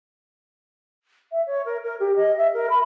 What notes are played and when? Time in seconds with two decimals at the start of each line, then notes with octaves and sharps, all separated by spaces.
1.32 E5
1.47 C#5
1.66 A#4
1.84 A#4
2.00 G4
2.16 D#5
2.38 E5
2.54 A#4
2.70 B5